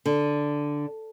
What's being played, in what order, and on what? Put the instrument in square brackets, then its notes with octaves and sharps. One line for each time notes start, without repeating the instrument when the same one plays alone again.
[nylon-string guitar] D3